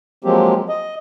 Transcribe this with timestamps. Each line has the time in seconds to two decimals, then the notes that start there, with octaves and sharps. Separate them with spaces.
0.24 F3 F#3 G#3 A#3 C4 G4
0.69 D#5